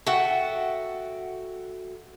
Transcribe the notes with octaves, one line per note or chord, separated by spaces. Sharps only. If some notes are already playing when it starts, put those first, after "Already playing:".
F#4 A4 E5 F#5 G5